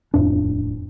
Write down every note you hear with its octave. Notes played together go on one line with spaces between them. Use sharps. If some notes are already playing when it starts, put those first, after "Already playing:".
D#1 F2 A2 D4